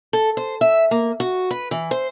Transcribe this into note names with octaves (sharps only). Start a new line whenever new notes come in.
A4
C5
E5
A#3
F#4
B4
E3
C5